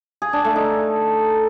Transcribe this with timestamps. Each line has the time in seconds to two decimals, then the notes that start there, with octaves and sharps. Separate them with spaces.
0.22 G#4
0.33 D4
0.44 A3
0.56 D#4